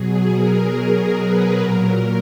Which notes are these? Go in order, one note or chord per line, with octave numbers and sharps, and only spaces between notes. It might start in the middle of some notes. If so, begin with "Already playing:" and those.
Already playing: B2 F#3 G#4
A#4
B4
A#2 F#3 A#4